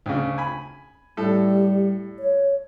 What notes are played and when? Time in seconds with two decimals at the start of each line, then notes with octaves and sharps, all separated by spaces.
0.06 D2 C#3
0.38 G#5 B5
1.17 A2 G3 A4
2.19 C#5